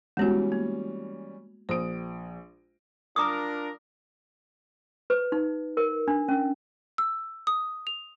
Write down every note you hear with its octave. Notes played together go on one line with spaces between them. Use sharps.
E3 G3 G#3 B3 C#4 F#4
A#3
A#1 C5 D#6 D7
D4 F4 A#4 A#5 D6 D#6
B4
D#4
A#4
D4
C#4
E6
D#6
F7